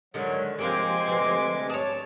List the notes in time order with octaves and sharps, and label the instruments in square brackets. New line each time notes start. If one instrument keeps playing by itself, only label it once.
[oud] D3 D#3 G#3 [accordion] F#3
[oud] C3 A#3 G4 [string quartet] F3 C4 G#5 [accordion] G#3 D6
[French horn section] D2 B4 [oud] C3
[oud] G#4 C#5 [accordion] A5